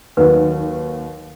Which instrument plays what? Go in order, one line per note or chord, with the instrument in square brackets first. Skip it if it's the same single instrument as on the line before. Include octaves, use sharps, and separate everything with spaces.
[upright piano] D#2 D#3 F#3 [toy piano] B4